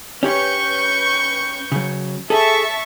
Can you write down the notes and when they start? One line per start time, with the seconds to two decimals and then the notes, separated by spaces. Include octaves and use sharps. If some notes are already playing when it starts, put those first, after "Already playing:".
0.23 C#4 G4 B4 C#5 C#6 G6
1.72 C#3 F#3
2.30 G#4 A4 E5 A5 C#6